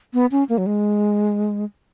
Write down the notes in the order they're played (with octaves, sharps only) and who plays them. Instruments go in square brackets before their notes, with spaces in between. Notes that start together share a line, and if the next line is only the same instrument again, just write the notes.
[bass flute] B3
C#4
A#3
F#3
G#3